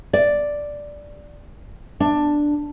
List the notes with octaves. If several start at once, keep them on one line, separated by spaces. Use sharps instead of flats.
D5
D4